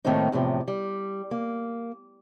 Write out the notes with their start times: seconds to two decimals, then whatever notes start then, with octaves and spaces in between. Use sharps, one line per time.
0.05 A2 D#3 A3 A#3 C4 D#4
0.32 E2 A2 C3 F3
0.68 G3
1.31 A#3